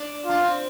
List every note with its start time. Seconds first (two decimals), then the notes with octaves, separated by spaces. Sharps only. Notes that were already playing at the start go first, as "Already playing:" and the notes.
Already playing: D4
0.25 D4 F4
0.40 C4